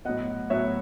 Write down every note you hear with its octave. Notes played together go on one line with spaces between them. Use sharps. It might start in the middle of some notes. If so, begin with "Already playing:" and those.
A2 F#3 B3 D#5 F#5
A2 F#3 B3 C#5 E5